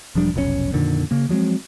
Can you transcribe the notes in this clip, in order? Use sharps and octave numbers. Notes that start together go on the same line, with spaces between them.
E1 F3 G3 D4
F1 B1 G#2 C#4
F2 A#2 D3 D#3
C#3 A#3
F3 F#3 G#3 C4